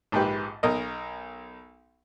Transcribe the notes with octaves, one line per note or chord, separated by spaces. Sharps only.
A#1 G#2 G4 B4
B1 A#4 D#5